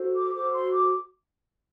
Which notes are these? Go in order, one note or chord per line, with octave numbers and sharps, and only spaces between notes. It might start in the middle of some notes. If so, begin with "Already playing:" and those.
Already playing: F#4 A4 C5
D6
F#4 A4 C5 D6
C6
D6